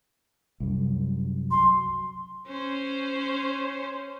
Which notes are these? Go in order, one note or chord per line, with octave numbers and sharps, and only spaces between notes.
C2 F#2
F#3 C6
C#4 C5